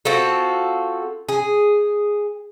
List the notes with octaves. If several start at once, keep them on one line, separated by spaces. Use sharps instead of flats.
C4 F4 F#4 A4
G#4